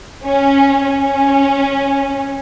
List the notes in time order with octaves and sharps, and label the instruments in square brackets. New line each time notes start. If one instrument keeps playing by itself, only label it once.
[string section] C#4
C#4